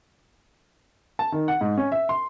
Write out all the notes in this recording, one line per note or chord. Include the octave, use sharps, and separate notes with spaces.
A5
D#3
F#5
G#2
C#4
E5
C6